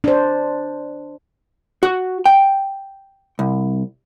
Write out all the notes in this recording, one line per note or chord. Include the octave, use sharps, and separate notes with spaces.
D4 C5
F#4
G5
C2